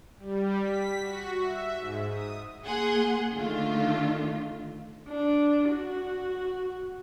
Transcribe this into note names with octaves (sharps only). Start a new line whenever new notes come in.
G3
B6
F#4
E5
G#2
D#6
A#3 G#4 F#5 C6
D3 D#3 A3 F4
D4
F#4